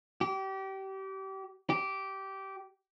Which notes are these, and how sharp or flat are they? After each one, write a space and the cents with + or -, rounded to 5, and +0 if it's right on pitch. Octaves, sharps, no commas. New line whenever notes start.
G4 -30
G4 -15